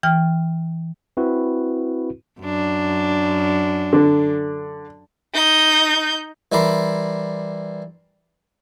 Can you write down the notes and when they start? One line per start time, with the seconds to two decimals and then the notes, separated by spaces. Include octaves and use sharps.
0.03 E3 G5 F6
1.17 C4 E4 F#4 B4
2.41 F#2 D4
3.93 D3
5.34 D#4 G6
6.52 E3 G3 E4 A#4 D5 C6